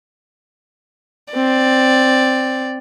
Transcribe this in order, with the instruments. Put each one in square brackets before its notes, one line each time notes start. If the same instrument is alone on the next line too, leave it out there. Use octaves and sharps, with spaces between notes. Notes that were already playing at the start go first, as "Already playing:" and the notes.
[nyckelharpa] C4 [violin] D5